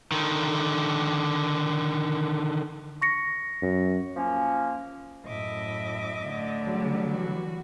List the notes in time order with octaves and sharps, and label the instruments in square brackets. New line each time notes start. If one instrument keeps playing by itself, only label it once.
[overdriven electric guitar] D3 D#3
[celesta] C#6 A#6 C#7
[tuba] F#2
[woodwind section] F3 A#3 C#4
[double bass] F#2 A2 [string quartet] D#5 E5 D6
[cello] D3 A3
[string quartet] C#3 [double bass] F#3 G3
[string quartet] E3 F#4